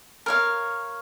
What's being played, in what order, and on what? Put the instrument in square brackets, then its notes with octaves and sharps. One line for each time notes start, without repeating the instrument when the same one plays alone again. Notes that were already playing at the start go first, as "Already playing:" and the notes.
[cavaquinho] A#4 C#5 F5